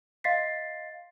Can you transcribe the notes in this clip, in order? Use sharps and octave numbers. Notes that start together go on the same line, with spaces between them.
D#5 F5 C6 A6 B6 C7